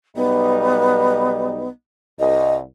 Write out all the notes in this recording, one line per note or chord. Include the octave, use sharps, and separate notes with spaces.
B1 G3 B3 D#4
C2 D#5